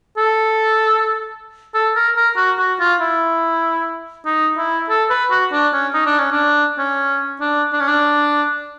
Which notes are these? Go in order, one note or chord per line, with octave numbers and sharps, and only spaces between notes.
A4
A4
A#4
A#4
F#4
F#4
F4
E4
D#4
E4
A4
B4
F#4
D4
C#4
D#4
D4
C#4
D4
C#4
D4
D4
C#4
D4